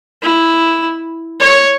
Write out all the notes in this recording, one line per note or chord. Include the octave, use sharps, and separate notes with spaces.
E4
C#5